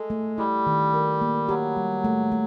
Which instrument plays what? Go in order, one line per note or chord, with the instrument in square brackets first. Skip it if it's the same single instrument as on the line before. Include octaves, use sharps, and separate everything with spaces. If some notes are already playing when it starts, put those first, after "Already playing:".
Already playing: [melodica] G#3 [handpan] A4
[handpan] A3
[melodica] G3 [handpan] E4
[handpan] D#3
A#4
A#3
[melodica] F#3 [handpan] G4
[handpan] G3
A3
A3